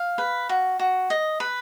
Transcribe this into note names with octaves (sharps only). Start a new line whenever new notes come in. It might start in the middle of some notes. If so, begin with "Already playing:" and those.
Already playing: F5
B4
F#4
F#4
D#5
B4